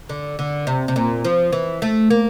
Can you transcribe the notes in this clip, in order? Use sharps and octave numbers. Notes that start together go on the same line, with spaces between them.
D3
D3
C3
C3
A#2
F3
E3
A3
A#3